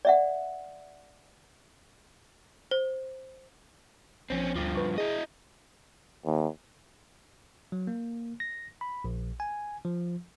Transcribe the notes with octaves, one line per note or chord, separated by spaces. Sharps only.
D5 E5 F#5
C5
A#1 F3 C4 C#4
D2 G2 F3 D6
B4 C#6
E4 G#4 D#5
D#2
F#3
A#3
A#6
B5
A#1
G#5
F3